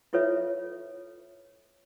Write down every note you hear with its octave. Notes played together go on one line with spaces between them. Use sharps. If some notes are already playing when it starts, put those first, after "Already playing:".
E4 F4 A4 B4 C#5 E5